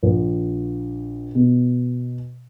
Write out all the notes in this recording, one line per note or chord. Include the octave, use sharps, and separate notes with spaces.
A#1
B2